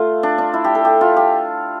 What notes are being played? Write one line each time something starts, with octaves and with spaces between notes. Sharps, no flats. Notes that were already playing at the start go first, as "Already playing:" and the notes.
Already playing: A3 F4
D4
D4
E4
G4
A4
G4
F4
G4